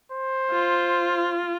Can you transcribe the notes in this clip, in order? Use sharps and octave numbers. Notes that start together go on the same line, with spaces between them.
C5
F4